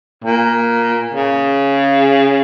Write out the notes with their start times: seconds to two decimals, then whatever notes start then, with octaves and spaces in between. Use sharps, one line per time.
0.24 A#2
1.14 C#3